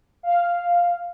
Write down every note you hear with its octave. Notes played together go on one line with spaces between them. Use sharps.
F5